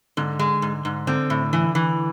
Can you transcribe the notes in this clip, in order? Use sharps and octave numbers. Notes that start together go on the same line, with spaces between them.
G#2 D3
G#3
G#2
G#2
D3 C4
A2
E3
E3